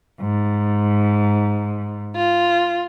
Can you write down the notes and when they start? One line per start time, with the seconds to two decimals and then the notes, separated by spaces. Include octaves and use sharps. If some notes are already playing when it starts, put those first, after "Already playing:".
0.19 G#2
2.13 F4